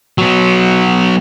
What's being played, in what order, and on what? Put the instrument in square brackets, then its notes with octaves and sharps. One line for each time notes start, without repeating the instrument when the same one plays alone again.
[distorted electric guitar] F#3 B3